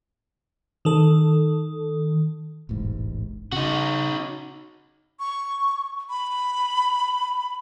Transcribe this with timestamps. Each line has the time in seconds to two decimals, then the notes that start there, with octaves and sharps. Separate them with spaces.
0.85 D#3 A4
2.69 E1 A1 G#2
3.52 C#3 D#4 F#4
5.20 C#6
6.09 B5